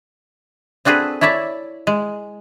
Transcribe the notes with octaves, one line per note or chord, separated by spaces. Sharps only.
C4 D4 F#4 G#4 A4 B4
E4 C#5 D5 E5 A5
G#3